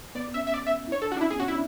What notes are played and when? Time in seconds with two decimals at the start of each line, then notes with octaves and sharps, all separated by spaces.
0.15 B3 D5
0.34 C#4 E5
0.47 E5
0.54 D5
0.67 E5
0.88 E4
0.92 D4 C#5
1.02 A4
1.11 C#4 F#4
1.17 D4
1.21 E4
1.30 B3 G#4
1.40 C#4 F#4
1.48 D4 E4